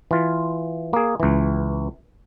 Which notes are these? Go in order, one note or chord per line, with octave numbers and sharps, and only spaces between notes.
E3 F4
A#3 G#4
C#2 E3